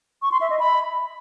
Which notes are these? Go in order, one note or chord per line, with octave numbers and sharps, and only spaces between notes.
C#6
C6
E5
D#5
B5